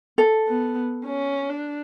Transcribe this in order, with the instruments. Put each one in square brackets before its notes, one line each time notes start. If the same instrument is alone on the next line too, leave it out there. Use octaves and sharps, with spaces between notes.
[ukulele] A4
[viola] B3
C#4
D4